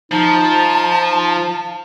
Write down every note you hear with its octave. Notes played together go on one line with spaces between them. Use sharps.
F3 D#4 A5